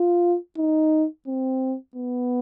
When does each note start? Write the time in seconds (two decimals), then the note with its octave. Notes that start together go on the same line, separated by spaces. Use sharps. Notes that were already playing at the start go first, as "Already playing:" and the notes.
Already playing: F4
0.57 D#4
1.27 C4
1.96 B3